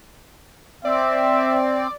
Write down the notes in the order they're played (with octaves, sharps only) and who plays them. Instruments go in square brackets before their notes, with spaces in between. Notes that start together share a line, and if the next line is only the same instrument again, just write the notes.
[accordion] C4 [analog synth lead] D5 [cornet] E5